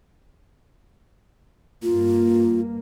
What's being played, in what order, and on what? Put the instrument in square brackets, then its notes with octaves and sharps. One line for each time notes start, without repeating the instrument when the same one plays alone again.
[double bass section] G2 A#3 [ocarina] F4